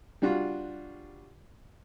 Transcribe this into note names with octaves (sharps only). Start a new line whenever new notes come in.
G3 D4 F4 F#4